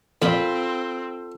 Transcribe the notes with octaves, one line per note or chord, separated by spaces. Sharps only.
F2 A#2 C4 F4 A4 B5